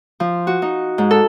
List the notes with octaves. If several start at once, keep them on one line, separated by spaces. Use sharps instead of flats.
F3
F#4
D#4
G#2
A4